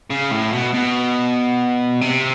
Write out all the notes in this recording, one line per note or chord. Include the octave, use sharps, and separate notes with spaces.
C#3
A2
B2
B2
C3